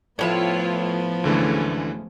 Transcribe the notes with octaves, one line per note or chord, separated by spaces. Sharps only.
A2 F3 B3 E4 F4 B4 C#5 E5
D2 D3 E3 G#3 A3 C#4